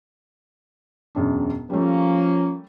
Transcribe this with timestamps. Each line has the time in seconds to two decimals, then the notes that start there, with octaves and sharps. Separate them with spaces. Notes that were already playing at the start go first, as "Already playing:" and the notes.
1.15 E1 F#2 D4
1.70 F3 G3 A3 A#3 C#4